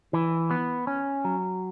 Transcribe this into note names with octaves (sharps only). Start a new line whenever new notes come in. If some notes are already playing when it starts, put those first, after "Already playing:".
E3
B3
C#4
F#3